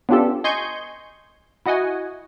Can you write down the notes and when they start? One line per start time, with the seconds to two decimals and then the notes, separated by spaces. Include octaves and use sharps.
0.09 B3 C#4 D4 F4 G4 A4
0.44 D#5 G#5 C6 C#6 G6
1.66 E4 F#4 D#5 F#5 G#5